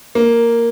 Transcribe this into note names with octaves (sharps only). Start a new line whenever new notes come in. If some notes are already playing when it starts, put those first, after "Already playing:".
A#3